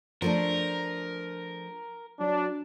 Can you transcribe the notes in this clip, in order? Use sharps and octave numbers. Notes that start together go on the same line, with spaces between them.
F3 A3 D4 A#4
F#3 D4